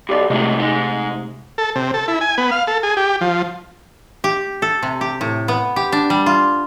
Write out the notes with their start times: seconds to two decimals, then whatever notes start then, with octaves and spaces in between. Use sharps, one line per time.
0.09 B1 G4 D5
0.30 F2 A2 C3 G#3 A3
0.58 G#2 D#4
1.58 A4
1.76 C3
1.94 A4
2.08 E4
2.21 G#5
2.38 B3
2.51 F5
2.68 A4
2.83 G#4
2.97 G4
3.21 F3
4.24 G4
4.62 A4
4.83 C3
5.01 G4
5.21 A2
5.48 B3
5.76 G4
5.92 D4
6.10 G3
6.26 F4